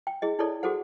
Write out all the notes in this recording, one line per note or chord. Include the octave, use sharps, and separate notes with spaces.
G5
E4 G#4 D#5
D#4 E4 G#4 A4 C#5 D5
F#4 G#4 A4 C5 F#5